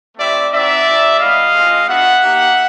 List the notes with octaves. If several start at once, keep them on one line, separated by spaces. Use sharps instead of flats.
A3 C4 E4 G4 D5 E5
C4 D#4 F#4 D5 E5
G#3 C4 D#4 F#4
G3 B3 E4 D#5 F5
G#3 C4 F4
B3 D4 F#4 E5 F#5
A#3 D#4 G4